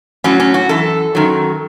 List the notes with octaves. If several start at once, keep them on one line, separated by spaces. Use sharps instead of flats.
A2 F#3 C#4
C#4
F#4
F#2 E3 A4
F#2 D#3 F#3